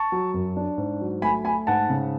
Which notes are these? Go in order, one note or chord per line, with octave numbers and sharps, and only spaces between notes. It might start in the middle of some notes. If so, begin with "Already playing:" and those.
Already playing: A5 C#6
F#3
F#2
D4
G#2
F#3
A3 G#5 B5
A3 G#5 B5
G#2 F#5 A5
C#3